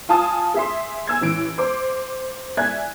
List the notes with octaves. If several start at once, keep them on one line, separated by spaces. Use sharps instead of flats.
F4 G#5 A5 D#6
G#4 E5 C6
G#5 E6 G#6
A1 E3 D7
C5 D6
D5 E5 G#5 F#6 G#6